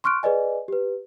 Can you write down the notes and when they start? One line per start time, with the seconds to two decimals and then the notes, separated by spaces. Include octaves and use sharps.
0.04 C6 C#6 F6 F#6 D7
0.23 G#4 B4 D5 D#5 G#5
0.68 G4 B4